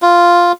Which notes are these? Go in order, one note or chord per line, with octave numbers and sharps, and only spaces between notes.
F4